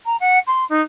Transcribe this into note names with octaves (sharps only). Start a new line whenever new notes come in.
A#5
F#5
C6
D#4